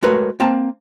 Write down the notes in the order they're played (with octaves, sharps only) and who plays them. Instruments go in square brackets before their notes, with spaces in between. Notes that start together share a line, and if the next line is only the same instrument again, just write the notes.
[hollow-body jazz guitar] G#3 A3 F#4 A#4 B4 C#5
A#3 C4 A5 A#5